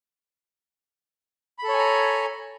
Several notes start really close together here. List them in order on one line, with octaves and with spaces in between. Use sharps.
B5 A4 C#5 G#5 A#5